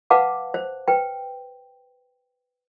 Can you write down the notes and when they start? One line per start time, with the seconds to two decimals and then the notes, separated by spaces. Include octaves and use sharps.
0.10 B4 F5 F#5 A5 D6
0.54 C5
0.88 B4 G5